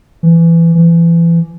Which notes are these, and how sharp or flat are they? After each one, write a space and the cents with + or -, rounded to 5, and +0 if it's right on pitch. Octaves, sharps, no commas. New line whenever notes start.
E3 +20
E3 +30